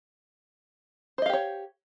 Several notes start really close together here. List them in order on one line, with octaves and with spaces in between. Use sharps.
C5 D#5 F5 G4 C#5